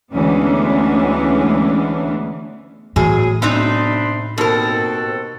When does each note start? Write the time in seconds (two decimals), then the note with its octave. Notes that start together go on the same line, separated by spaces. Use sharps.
0.14 D2 E3 G#3 B3 C#4 D4
2.96 E2 A2 F#3 G#4
3.42 B1 C3 C4 D4 D#4 B5 C6
4.38 D#2 B2 C4 F#4 A4 A#4